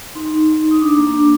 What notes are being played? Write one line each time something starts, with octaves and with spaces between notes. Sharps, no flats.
D#4 C6
D#4
D#4
D#4
D#6
D4 D6
A#3
D4